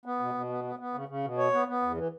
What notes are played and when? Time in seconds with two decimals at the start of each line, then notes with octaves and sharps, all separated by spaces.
0.05 B3
0.20 B2
0.35 B2
0.49 B3
0.64 B3
0.79 B3
0.94 C#3
1.09 C#3
1.24 B2
1.38 C#5
1.53 B3
1.68 B3
1.82 E2
1.97 E3